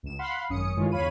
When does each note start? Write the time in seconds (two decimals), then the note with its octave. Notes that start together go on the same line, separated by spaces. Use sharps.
0.03 C#2 E7
0.19 F5 F#5 B5 C6
0.49 G#1 F#2 C#4 D#6 C#7
0.77 G2 D#3 E3 G#3 C#4 F4
0.92 E2 D3 C#5 F5 B5 D#7